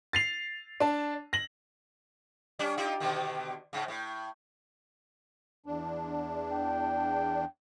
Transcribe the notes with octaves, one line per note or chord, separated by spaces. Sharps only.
A6 C7 F7
D4 A5
A#6 F#7
G3 C#4 D4
D#4 F4 G4
B2 D3 D#3
G#2 C#3
A2
E2 D4
G5